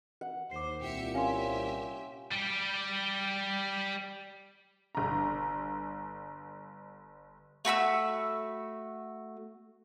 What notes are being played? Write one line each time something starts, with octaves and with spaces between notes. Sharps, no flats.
F#5
D#2 C5 D6 C7
C2 A#2 G4 E5 C#7
C#4 G4 E5 F5 G#5 C6
G3 G4
G1 A#5
A3 F#4 B5 E6